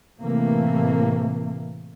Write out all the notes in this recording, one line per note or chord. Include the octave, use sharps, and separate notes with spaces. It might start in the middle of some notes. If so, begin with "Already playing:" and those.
A2 C3 E3 A3 A#3